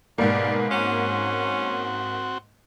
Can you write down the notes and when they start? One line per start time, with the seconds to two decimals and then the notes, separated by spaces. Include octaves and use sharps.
0.18 G#2 B2 G3 A#3
0.71 C4 C#4 F#4